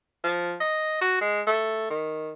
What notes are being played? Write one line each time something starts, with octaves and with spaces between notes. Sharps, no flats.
F3
D#5
F#4
G#3
A3
D#3